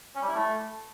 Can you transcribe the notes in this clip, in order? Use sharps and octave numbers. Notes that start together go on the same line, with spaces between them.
C#4
G3
E4
A3